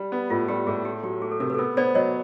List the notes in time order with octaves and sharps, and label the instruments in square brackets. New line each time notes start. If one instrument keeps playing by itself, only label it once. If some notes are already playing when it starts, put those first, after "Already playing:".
Already playing: [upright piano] G3
B3
[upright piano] A2 [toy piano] F4
[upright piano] G3 [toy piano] G4
[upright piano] A2 [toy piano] G#4
[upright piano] A3 [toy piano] G4
[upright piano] F#3 [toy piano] G4
[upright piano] A3 [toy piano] G#4
[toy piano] A4
[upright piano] C3 [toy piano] A#4
[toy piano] B4
A4
[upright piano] B3 [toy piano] A#4
[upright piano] B3 [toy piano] C5 D5
[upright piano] F#3 [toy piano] C#5 D#5